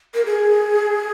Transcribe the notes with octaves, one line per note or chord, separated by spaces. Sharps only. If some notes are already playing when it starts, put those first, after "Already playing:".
A#4
G#4